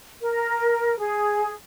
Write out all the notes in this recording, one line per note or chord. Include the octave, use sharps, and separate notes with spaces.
A#4
G#4